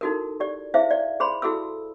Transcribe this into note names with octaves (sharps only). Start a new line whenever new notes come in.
D#4 E4 F#4 A4 A#4
G4 D5
E4 G#4 C5 E5 F5
D5
G#4 C5 B5 C6
E4 F#4 G#4 A4 E6